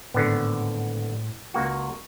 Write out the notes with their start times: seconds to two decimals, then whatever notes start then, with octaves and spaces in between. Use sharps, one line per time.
0.14 G#1 A2 D3 B3
1.54 C#2 A#3 F#4